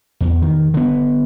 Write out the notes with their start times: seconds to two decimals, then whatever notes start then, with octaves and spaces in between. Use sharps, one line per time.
0.21 E2
0.42 D#3
0.74 D3 B3